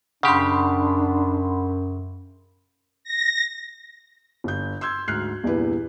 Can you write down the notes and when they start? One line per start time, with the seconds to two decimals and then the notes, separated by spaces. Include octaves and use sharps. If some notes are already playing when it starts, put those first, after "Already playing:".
0.23 F#2 C#3 D4 G4 F#5 B5 C6
3.04 A#6
4.44 G1 G6
4.81 C6 E6 G6 G#6
5.08 D2 G#2 F6 F#6 C7
5.44 E2 G2 A#2 E4 B4